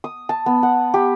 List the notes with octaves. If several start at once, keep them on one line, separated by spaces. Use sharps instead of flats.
D#6
A5
B3
F#5
G4